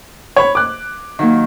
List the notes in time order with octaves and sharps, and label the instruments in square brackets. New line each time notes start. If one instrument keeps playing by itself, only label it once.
[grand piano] C#5 B5
D6 F#6
[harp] D#3 F#3 A#3